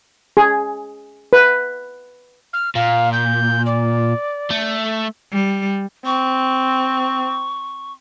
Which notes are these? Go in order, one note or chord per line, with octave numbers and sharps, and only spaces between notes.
G#4
B4
F6
A#2 F5
G6
D5
A3
G3
C4 C#6